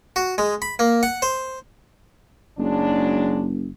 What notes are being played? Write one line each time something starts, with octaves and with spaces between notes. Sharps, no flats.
F#4
G#3
B5
A#3
F#5
C5
F#1 F#3 G#3 D4